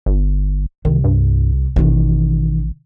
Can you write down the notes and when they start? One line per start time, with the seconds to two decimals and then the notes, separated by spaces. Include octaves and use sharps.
0.06 G1
0.85 C2 D#3
1.04 G2
1.76 A1 B2 D#3